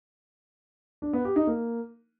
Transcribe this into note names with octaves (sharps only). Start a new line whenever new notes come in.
D4
B3
G4
D#4
A#3